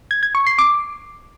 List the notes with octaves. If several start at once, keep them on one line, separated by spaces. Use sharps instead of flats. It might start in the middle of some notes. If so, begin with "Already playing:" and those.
G#6
G#6
C#6
C7
D6